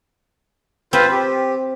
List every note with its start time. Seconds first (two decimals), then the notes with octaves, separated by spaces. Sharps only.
0.93 C4 F4 B4 C5
1.11 G4